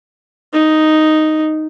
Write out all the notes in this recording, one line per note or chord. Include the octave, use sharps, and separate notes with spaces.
D#4